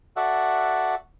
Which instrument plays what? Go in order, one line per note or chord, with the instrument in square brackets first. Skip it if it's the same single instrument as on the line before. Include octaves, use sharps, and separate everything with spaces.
[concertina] F#4 A4 D5 E5 F#5